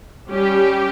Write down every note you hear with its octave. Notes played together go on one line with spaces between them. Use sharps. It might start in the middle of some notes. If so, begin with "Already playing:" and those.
G3 C#4 G4